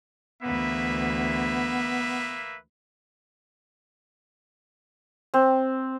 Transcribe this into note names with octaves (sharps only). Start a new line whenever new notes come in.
D2 E3 A#3 B3 B4 E5
C4